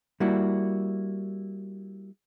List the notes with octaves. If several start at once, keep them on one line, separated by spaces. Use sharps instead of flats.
G3 A#3 E4 F#4